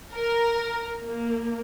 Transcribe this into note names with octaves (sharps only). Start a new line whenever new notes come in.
A#4
A#3